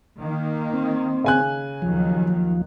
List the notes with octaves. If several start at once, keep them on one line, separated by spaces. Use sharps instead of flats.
D#3 A#3
C4
C#3 G#5 F#6
D#2 D#3 F3 F#3